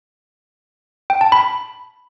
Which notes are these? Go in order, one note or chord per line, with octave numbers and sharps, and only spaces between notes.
G5
A5
B5